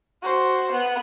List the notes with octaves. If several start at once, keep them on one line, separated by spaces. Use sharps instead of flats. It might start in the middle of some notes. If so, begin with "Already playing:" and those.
F#4 C5
B3